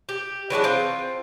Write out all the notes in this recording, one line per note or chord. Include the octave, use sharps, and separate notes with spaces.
G4
E3 F#3 G#3 D4
C4 F4